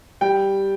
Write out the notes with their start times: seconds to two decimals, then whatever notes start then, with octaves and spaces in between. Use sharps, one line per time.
0.21 G3 G5